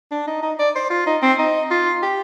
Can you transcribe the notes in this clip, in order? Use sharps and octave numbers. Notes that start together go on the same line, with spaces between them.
D4
D#4
D#4
D5
C5
F4
D#4
C4
D#4
F4
G4